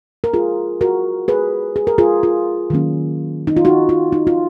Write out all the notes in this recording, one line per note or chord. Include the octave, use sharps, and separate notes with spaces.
A#4
F4 G#4
F#4 A#4
G#4 B4
G#4
A#4
F4 G#4
F4
D#3 F#3 A#3 C#4
D#4
F4
D#4 F#4
F4
D#4
F4